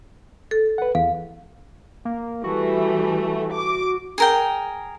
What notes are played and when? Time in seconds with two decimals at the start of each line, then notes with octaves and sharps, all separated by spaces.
0.51 A4
0.78 B4 F#5
0.95 E2 F5
2.05 A#3
2.44 E3 G3 A3 F#4
3.53 D6
4.18 G#4 A#4 G5